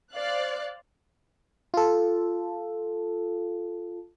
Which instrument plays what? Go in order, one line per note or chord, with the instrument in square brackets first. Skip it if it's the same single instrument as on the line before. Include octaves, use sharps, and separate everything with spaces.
[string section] C5 D5 F5 F#6
[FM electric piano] F4 A4